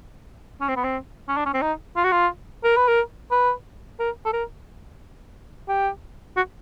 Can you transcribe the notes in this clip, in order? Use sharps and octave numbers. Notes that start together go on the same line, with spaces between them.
C#4
C4
B3
C4
C#4
D4
C#4
C4
D#4
F4
F#4
F4
A#4
B4
A#4
B4
A#4
A4
A#4
G4
F#4